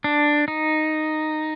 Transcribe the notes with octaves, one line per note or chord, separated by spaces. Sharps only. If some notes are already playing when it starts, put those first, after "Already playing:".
D4
D#4